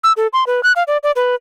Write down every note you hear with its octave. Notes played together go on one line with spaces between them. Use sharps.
E6
A4
C6
B4
F#6
F5
D5
D5
B4